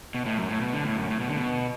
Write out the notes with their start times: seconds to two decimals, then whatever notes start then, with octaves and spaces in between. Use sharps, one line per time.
0.14 B2
0.26 A2
0.38 F#2
0.49 A2
0.61 B2
0.73 D3
0.84 A2
0.97 F#2
1.09 A2
1.20 B2
1.28 D3
1.37 B2